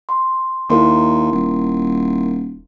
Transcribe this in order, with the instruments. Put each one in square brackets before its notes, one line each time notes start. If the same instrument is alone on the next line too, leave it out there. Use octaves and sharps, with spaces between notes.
[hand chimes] C6
[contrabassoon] D#2 [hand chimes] E4 A#4 C6
[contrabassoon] D#1